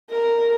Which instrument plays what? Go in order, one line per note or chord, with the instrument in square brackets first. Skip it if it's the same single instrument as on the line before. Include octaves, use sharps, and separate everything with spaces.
[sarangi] A#4